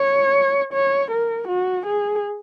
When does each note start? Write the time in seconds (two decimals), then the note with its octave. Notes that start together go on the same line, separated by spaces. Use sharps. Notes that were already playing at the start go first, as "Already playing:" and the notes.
Already playing: C#5
0.73 C#5
1.11 A#4
1.48 F#4
1.86 G#4